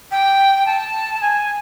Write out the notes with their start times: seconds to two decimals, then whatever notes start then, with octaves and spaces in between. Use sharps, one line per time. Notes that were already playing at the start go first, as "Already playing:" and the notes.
0.11 G5
0.66 A5
1.21 G#5